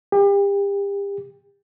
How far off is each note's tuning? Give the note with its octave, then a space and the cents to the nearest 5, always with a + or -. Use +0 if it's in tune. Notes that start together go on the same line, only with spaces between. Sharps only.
G4 +35